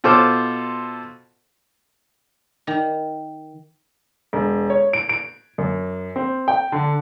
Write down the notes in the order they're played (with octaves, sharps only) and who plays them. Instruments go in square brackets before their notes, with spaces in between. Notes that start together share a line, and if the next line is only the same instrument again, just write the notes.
[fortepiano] B2 F4 A4 C5 D6 F6
[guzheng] D#3
[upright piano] E1
C#5
D7
D7
F#2
C4
G5
D3